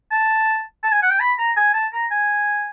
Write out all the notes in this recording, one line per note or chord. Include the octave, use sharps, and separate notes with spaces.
A5
A5
G#5
F#5
G5
B5
A#5
G#5
A5
A#5
G#5